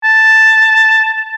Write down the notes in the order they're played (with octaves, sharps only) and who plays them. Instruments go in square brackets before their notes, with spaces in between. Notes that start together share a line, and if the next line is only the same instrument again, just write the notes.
[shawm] A5